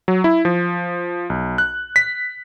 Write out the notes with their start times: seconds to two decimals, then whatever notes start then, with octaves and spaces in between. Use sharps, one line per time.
0.08 F#3
0.24 E4
0.45 F3
1.30 B1
1.58 F#6
1.96 B6